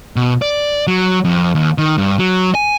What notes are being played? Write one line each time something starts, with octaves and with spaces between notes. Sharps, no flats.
B2
D5
F#3
F2
D#2
D#3
G2
F#3
G#5